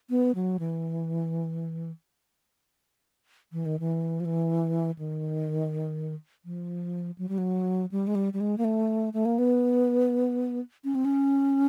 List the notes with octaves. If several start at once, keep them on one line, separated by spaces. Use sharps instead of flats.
B3
F#3
E3
E3
D#3
E3
F3
E3
D#3
F3
F#3
G3
F#3
G3
G#3
G3
G3
G#3
A#3
A3
A3
A#3
B3
C#4
C4
C#4